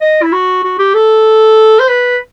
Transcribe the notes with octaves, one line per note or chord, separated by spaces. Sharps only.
D#5
E4
F#4
F#4
G4
A4
C5
B4